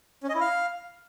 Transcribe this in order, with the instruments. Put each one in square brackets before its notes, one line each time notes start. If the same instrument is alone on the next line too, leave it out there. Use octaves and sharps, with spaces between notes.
[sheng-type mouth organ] C#4
D#5
E4
F5